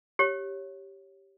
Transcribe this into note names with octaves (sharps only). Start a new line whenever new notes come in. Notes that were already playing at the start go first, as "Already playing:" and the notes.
G4 C#5